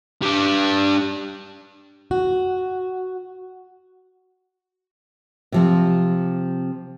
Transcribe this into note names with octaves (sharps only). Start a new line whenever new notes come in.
G3 D4
F#4
C3 F3 C4